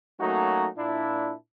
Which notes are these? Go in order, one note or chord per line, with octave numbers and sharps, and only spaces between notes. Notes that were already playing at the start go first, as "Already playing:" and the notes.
F#3 A3 A#3 C#4 D#4 F#4
A#2 D4 E4